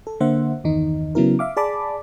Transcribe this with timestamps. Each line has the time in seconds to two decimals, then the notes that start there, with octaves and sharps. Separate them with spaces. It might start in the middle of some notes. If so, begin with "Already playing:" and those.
0.07 A4
0.20 D3 A#3 C5 E5 F#5
0.64 G1 E2 D#3 D#4
1.15 C#3 F#3 B3 E4 A#4
1.39 E5 F5 D6
1.57 G#4 D5 A5 B5 D6